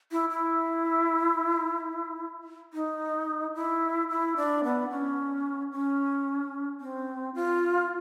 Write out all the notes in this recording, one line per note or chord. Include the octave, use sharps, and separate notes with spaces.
E4
E4
D#4
E4
E4
D4
B3
C#4
C#4
C4
F4